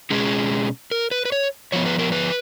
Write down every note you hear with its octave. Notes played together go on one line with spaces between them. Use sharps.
B2 G#3 C#4 G#4
A#4
B4
B4
C#5
F3 B3 C#5
B4
A#4
B4